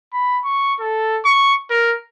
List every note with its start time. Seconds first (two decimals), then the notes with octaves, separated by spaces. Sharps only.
0.13 B5
0.44 C#6
0.80 A4
1.25 C#6
1.71 A#4